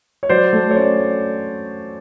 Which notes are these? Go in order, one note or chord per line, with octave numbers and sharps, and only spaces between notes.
C#5
F#3 C5 D5
A3
C#5
C#4 C5 D5